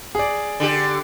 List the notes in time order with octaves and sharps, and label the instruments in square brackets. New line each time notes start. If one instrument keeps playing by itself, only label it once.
[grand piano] G#4 D5
[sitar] D3 G4